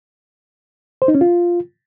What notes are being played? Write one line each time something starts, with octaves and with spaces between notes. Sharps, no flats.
C5
D#4
C#4
F4